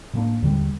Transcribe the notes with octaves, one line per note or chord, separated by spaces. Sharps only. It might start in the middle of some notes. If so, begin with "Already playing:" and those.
A2 G3 A#3 D4
D#2 D3 G3